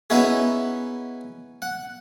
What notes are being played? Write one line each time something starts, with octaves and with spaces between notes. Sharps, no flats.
B3 C#4 D#4 E4 F#4 G#4
F#5